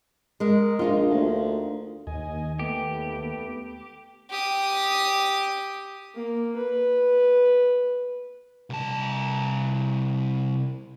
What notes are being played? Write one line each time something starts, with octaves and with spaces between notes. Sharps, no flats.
G#3 A#4
A#1 A#3 D#4 F4
D2
D#2 D#5 G#5
A3 B3 G4
G4 D#6
A#3
B4
C2 A5